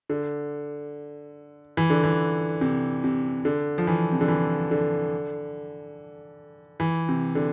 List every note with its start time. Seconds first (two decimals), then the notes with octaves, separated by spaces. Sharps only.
0.10 D3
1.77 E3
1.90 D3
2.04 E3
2.61 C3
3.04 C3
3.45 D3
3.78 F3
3.87 E3
4.12 C3
4.21 D3
4.28 E3
4.71 D3
6.80 E3
7.08 C3
7.35 D3